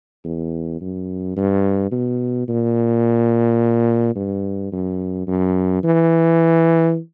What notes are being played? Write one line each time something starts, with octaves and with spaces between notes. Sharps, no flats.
E2
F#2
G2
B2
A#2
G2
F#2
F#2
E3